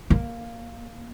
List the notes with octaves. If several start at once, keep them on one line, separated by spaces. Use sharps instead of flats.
A#3